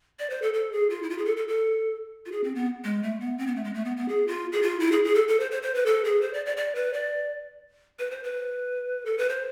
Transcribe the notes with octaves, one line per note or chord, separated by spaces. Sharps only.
D5
C5
A4
A4
G#4
F4
E4
F4
G#4
A4
A4
A4
F4
G#4
C4
B3
G#3
A3
B3
C4
B3
A3
G#3
A3
B3
B3
G#4
F4
G#4
F4
E4
G#4
G#4
A4
A4
C5
C5
C5
B4
A4
G#4
C5
D5
D5
D5
B4
D5
B4
C5
B4
A4
B4
C5